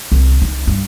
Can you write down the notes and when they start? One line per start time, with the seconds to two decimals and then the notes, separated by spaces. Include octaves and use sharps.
0.12 C2
0.41 D#4
0.67 G2